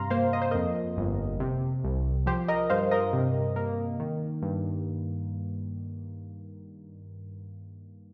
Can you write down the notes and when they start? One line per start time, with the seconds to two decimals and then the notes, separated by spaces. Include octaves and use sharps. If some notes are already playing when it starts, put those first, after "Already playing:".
Already playing: G2 C3 F5 A#5 C6
0.10 A#3 C5 F5
0.33 D#5
0.42 C5
0.51 F2 A#4 D#5
0.97 G1
1.40 C3
1.84 C2
2.26 F3 G4 C5
2.48 A#4 D#5
2.70 G2 C5 F5
2.91 A#4 D#5
3.13 C3
3.56 A#3
4.00 D#3
4.42 G2